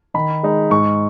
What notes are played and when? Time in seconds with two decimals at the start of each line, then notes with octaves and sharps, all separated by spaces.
0.14 D#3 B5
0.43 G#3 D#4
0.70 G#2 C#6